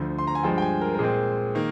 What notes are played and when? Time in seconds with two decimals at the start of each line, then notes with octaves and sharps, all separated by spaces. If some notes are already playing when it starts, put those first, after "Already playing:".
Already playing: D2 D3 F3
0.18 C6
0.27 A#5
0.35 G#5
0.43 G2 F3 G#3 G5
0.58 G5
0.62 G#5
0.81 A#4
0.94 A#4
0.99 A#2 G#3 C4 G#4
1.55 D#3 A#3